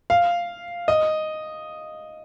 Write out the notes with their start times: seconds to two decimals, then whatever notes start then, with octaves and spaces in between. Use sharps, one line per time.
0.10 F5
0.88 D#5